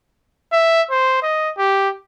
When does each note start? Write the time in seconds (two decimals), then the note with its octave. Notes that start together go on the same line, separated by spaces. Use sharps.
0.53 E5
0.91 C5
1.23 D#5
1.58 G4